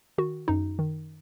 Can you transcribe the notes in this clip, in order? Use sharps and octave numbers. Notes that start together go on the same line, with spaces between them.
D#3 F#4
F#2 D#4
D#3